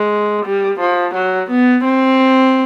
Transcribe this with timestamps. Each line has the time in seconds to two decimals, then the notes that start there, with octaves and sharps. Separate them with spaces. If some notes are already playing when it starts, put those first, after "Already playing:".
Already playing: G#3
0.46 G3
0.80 F3
1.15 F#3
1.50 B3
1.84 C4